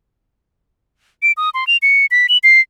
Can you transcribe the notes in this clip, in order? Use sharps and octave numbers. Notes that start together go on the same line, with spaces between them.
D7
D#6
C6
F7
C#7
B6
F#7
C7